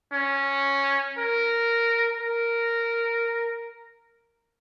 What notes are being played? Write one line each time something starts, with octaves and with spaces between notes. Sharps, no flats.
C#4
A#4
A#4